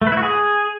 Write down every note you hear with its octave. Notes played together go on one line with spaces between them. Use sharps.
A3
B4
E4
F#4
G#4